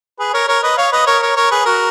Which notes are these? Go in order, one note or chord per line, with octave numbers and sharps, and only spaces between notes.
G#4 B4
A#4 C#5
A#4 C#5
B4 D#5
C#5 F5
B4 D#5
A#4 C#5
A#4 C#5
A#4 C#5
G#4 B4
F#4 A#4